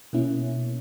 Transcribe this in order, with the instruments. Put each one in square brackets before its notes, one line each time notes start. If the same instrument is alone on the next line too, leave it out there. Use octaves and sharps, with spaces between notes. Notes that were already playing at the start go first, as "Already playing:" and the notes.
[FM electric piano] B2 A#3 C#4 E4